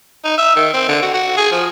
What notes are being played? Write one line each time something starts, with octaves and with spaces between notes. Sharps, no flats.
D#4
E5
D#3
C4
D3
F#4
F#4
G#4
F3